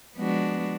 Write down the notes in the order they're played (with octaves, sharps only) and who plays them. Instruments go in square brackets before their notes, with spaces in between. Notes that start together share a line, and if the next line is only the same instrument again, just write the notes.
[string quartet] F3 G#3 B3 D4 F#4